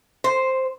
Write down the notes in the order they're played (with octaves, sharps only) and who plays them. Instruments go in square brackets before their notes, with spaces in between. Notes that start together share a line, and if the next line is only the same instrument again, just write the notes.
[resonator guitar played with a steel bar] C5